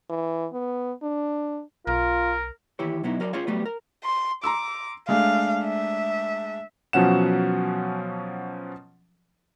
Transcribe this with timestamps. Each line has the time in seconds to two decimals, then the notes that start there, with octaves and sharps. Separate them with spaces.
0.10 E3
0.53 B3
1.03 D4
1.87 B1 F4 A#4
2.79 D#2 E3 E4 G4 C#5
3.03 B2 F#3 B3 D#4 E4
3.20 F#3 A#4 B4 D5
3.33 C#4 F4 G#4 C#5 F5
3.47 F#3 G3 A3 B3
3.65 A#4
4.04 C6
4.44 A#5 C6 D6 E6
5.08 G#3 A3 D4 F5
5.64 E5
6.93 B2 F3 F#3 C#4 F#5 E7